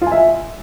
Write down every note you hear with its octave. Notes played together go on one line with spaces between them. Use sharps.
F4
G#5
E5